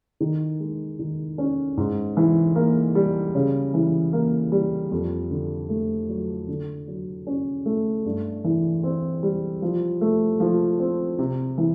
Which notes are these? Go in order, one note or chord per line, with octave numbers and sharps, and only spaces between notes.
D#3
G#3
D#3
C#4
G#2
E3
A#3
G3
C#3
E3
A#3
G3
F2
D3
A3
F#3
D3
F#3
C#4
A3
G2
E3
C4
G3
F3
A3
F3
C4
C3
E3